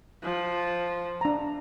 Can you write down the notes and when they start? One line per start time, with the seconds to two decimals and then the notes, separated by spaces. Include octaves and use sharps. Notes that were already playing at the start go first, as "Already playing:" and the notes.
0.23 F3
1.21 D4 A#5